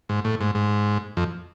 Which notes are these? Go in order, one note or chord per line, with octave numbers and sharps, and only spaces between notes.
G#2
A2
G#2
G#2
F2